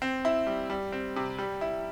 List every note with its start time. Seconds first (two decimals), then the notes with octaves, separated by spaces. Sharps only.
0.02 C4
0.25 E4
0.47 G3
0.70 G3
0.92 C4
1.16 C3
1.39 G3
1.61 E4